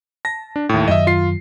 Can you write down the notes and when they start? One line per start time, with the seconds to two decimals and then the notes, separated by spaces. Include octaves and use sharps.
0.25 A5 A#6
0.56 D4
0.69 D#2 A2 E5
0.88 F#2 D#3 F#3 D#5 E5
1.07 F4 C7